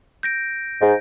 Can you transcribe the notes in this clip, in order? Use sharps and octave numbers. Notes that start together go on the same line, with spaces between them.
G6 A#6 D7
G#2